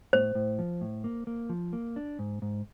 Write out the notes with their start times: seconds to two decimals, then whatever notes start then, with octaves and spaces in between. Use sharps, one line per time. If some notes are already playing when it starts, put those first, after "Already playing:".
0.13 A2 C5
0.35 A2
0.59 F3
0.81 A2
1.04 A#3
1.27 A#3
1.49 F3
1.73 A#3
1.96 D4
2.19 G#2
2.42 G#2